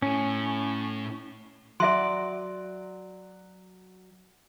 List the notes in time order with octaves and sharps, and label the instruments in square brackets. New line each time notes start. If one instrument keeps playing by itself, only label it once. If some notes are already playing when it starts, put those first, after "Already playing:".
[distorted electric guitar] A2 [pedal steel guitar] C#4
[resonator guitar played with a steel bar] F#3 D5 [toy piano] E5 C6